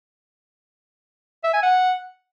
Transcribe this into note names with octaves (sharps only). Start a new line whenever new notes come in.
E5
G#5
F#5